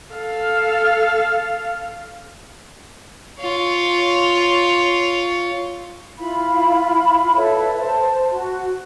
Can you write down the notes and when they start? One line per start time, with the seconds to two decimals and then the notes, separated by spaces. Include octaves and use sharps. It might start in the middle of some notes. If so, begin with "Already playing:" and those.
0.13 A4 F5
3.40 F4 C#5
6.18 E4 F4 F5 B5
7.35 A4 B4 C#5 E5
7.77 C5 A5
8.30 F#4